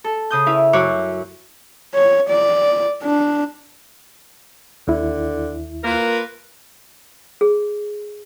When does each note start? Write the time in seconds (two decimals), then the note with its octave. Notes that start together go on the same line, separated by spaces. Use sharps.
0.04 A4
0.31 C#3 D#6 G6
0.46 C#4 E4 B4 F5
0.73 F#2 C#5 D6 F#6
1.94 C#5
2.29 D5
3.03 D4
4.88 D#2 D3 E4
5.84 A#3 F4 A#4 B4
7.41 G#4